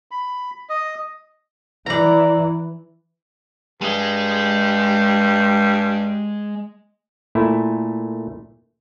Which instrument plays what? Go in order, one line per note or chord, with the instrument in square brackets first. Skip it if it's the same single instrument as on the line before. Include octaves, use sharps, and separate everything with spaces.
[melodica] B5
D#5
[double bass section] E3 [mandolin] D5 A#5
[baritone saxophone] G2 [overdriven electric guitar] G#3 D#5
[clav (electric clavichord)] A#2 A3 E4